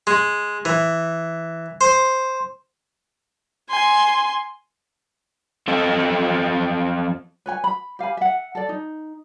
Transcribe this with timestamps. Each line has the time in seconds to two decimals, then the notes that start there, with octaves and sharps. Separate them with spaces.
0.07 G#3
0.65 E3
1.81 C5
3.70 G#5 C6
5.68 F2 C4 A4 D#5
7.46 B4 C#5 G#5
7.64 B5
7.99 G4 F5 G#5 B5
8.17 E5 F#5
8.55 A4 D5
8.69 D#4